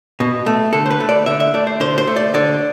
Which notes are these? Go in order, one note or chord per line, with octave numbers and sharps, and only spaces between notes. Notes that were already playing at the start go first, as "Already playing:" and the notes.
B2
A3
D3 A4
C5
B4
A3
D5
D3 E5
E5
A3 D5
C5
D3 C5
C5
A3
D5
D3 D5